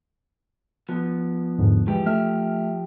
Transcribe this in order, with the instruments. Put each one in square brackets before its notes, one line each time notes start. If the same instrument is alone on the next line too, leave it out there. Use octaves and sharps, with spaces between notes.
[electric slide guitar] F3 B3
[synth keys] E2 G#2 D3
[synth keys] E3 G#3 [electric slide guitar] F3 G4
[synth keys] A3 E5 F6